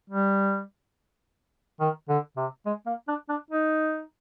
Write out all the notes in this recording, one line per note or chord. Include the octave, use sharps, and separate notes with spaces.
G3
D#3
D3
C3
G#3
A#3
D4
D4
D#4